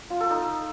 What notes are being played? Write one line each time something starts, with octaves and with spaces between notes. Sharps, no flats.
F4
A4
D#4